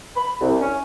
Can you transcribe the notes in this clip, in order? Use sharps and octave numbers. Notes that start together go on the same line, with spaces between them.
B5
C2
C#4